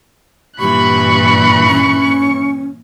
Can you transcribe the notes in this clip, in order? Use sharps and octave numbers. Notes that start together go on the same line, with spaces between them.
G2 A#2 E3 G4 B5 C#6 F#6
C#4